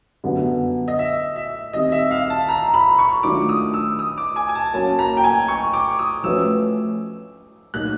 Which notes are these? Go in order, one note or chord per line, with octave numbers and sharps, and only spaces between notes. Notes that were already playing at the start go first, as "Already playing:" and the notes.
F#2 D3 G3 B3
D#5
E5
E5
D#3 G3 C4 D#5
E5
F5
A5
A#5
B5
C#6
D#3 F#3 A3 D4 F4 D6
D#6
E6
D#6
D6
G#5
G#5
A5
F#3 A#3 C#4 A5
A#5
G5
G#5
C#6
D6
D#6
F3 A3 C#4 F#4 B4 E6
A#2 F#3 A#3 D#4 F#4 F#6